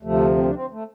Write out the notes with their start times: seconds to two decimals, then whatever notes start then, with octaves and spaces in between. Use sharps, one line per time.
0.03 D2 C3 F3 A3
0.37 C4
0.46 D4
0.54 C4
0.71 A3